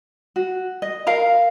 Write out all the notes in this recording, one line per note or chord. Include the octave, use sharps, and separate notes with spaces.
F#4
D#5
A#4 F5 A#5